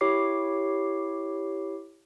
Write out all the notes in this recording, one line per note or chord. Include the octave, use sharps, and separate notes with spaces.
E4 G4 C#5 D6 C7